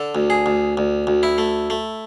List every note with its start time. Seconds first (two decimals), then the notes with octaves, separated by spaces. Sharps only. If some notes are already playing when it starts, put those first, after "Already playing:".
Already playing: D3 A4
0.15 D2
0.30 G#4
0.46 D2
0.77 D2
1.07 D2
1.23 E4
1.38 A3
1.70 A3